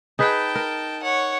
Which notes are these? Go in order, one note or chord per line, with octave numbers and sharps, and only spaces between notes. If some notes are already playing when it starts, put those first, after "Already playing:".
D#4 G#4 B4 G5 A5
A#4
C#5 F#5